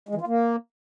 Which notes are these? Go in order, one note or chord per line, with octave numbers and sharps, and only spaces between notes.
G#3
E3
F4
A#3